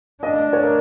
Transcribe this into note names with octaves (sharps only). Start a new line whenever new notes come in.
D4 D#5
D5
C#5
A#4